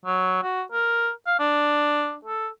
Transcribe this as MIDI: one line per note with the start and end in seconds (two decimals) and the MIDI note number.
0.05 0.42 54
0.43 0.63 66
0.72 1.10 70
1.27 1.38 77
1.39 2.17 62
2.25 2.49 69